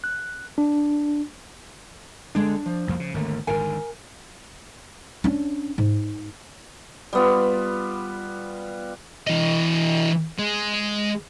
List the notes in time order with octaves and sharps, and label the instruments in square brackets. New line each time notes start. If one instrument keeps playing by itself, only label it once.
[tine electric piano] F#6
D4
[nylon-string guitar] D3 G#3 D5 [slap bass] D4
[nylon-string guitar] F3
[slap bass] C2 F2 A#3
C#3
[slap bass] G#1 D3 A3 [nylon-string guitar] D#2
[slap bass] G#1 G#2 D3 [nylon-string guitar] A#4 G#5
[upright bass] C#4 D4
G#2
[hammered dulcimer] G3 B3 F4
[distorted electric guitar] E3 D#5
G#3